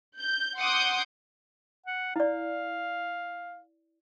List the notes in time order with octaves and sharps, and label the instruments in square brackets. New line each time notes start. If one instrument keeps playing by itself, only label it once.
[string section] G6
F#5 C6 D6 D#6 G6
[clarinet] F#5
[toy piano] E4 D5 [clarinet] F5